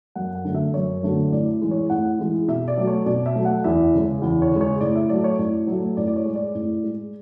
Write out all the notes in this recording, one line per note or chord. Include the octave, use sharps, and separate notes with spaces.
F#2 F#5
F#5
D3 F#3 A3
E5
F#2 C#5
D3 F#3 A3
A2 D5
E3 G#3
C#5
A2 F#5
E3 G#3
B2 E5
D5
F#3 A3
C#5
B2 D5
E5
F#3 A3
F#5
E2 E5
C#3 G#3
E2
C#5
C#3 G#3
C#5
A2 D5
E5
F#3 A3 D5
C#5
A2 D5
F#3 A3
A2 D5
D5
C#5
G#3
D5
A2
G#3